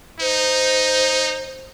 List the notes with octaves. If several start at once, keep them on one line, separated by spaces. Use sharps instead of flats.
D#4 C5